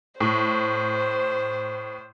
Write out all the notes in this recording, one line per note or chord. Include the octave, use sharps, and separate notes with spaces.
A2 C5